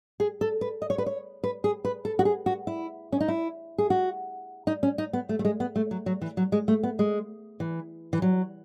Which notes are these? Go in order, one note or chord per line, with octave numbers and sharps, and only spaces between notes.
G#4
A4
B4
D#5
C#5
B4
C#5
B4
G#4
B4
A4
F#4
G#4
F#4
E4
C#4
D#4
E4
G#4
F#4
D#4
C#4
D#4
B3
A3
A3
G#3
B3
A3
F#3
F#3
E3
F#3
G#3
A3
B3
G#3
E3
E3
F#3